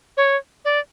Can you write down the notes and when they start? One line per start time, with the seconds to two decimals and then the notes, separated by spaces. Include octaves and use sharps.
0.17 C#5
0.65 D5